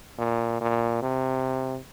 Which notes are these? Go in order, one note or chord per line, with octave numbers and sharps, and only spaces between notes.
A#2
A#2
C3